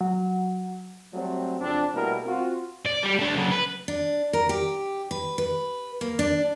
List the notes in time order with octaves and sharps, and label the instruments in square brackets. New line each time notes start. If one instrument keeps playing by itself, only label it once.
[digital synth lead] F#3
[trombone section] F#3 G3 A3 C4
F2 C#3 C4 D4
B2 G3 A3 A#3 E4 A#4
C4 F4 F#4
[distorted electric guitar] D5
G3 G4
A3 D4
C#3 F#3
B4
[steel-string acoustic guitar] D4
A#4
G4
B4
B4
A#3
D4